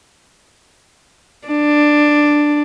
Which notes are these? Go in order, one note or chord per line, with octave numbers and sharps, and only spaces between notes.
D4